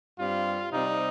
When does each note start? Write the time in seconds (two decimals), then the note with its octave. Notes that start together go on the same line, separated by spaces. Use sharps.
0.18 G2 G3 C4 F4
0.71 C3 G3 C4 D#4